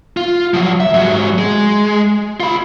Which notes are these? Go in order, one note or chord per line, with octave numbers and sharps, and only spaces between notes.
F4
F3 F#3
E5
G#2 F#3
G#3
F4 B5